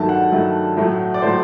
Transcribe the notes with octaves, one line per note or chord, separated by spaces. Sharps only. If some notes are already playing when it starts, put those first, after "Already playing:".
Already playing: G2 D#3 F#3 A3 A5
F#5
G2 D#3 F#3 A3
A2 F#3 A3
D5
A2 F#3 A3 C5